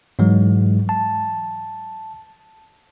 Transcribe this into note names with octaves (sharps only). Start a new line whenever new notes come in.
G#2 E3 F#3 G#3
A5